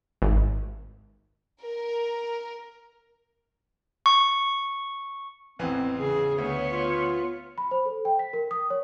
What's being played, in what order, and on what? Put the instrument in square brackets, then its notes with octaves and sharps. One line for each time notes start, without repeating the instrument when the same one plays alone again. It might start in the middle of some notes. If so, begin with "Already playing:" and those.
[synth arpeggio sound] G#1
[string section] A#4
[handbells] C#6
[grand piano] A1 E2 E3 [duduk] C4
[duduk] C#3 [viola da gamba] G#4
[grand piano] D2 [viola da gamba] B3 C#5
[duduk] F4
[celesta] B5
C5
A4
G5
B6
A#4
D#6
C#5